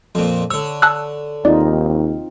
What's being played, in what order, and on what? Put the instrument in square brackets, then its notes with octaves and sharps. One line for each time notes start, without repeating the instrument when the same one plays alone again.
[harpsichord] F2 A#2
[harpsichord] D3 C#5 [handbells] E6
[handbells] A5 E6 F#6
[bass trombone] D#2 [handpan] C4 D#4 F4 [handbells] D5